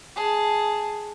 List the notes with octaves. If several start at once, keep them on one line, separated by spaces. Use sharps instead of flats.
G#4 A5